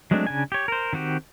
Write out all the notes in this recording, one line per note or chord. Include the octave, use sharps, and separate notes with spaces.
F#3 G#3 A3 C4 D4
C#3 D4 G#5
G4 C#5
A#4 C5
D#3 C4 F#4 G4